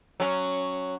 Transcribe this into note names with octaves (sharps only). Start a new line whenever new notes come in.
F#3 C#4